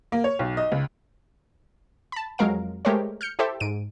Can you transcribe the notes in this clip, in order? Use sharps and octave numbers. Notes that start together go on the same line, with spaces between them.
A#3
C#5
B1
D#5
C#2
A5 B5
F2 F#3 G#3 A#4 F5 D7
G#3 A3 G4 A#4 C5 C#5
F6 G6 C#7
E4 G4 A4 C5 E5
G#2 D7 D#7